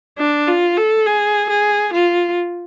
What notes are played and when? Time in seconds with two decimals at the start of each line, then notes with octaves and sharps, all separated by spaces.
0.18 D4
0.47 F4
0.77 A4
1.06 G#4
1.50 G#4
1.93 F4